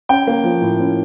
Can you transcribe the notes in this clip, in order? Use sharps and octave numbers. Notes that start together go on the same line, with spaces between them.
C#4 G5
A#3
F3
A2
C#4